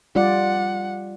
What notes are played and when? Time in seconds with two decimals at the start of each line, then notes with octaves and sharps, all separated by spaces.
0.16 G3 F4 D5 F#5